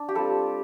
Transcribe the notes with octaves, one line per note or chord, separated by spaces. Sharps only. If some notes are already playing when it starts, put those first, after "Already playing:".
Already playing: D4
G4
G3 C4 F4 A4